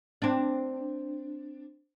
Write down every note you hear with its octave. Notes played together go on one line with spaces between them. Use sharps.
C4 D4